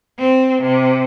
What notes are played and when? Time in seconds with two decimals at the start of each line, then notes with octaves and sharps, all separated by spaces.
0.19 C4
0.62 C3